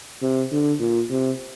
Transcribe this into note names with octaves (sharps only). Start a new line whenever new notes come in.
C3
D3
A#2
C3